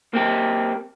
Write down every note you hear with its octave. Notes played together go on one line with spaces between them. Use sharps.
A#3 C4 G4